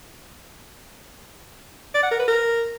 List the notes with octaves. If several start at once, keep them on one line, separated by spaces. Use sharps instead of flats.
D5
F#5
A#4
B4
A#4